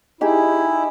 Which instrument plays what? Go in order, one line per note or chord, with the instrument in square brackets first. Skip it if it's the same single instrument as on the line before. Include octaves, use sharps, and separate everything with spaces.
[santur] D#4 G4 G#4 [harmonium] E4